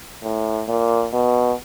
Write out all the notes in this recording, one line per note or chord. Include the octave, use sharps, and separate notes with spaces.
A2
A#2
B2